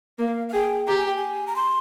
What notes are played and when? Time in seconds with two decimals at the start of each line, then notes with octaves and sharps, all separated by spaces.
0.19 A#3 F5
0.49 F5
0.53 G#4 G5
0.87 G4 A#5
0.97 G#5
1.07 G5
1.16 G#5
1.47 A#5
1.56 C6